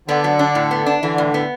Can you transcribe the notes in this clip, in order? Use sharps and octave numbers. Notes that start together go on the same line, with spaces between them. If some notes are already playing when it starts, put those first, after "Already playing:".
D3 B3
F#3
D4
A2
B3
D4
D3 E3
A2
B3